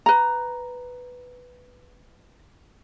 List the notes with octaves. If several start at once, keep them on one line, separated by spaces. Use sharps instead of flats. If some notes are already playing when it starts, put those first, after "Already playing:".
B4 A#5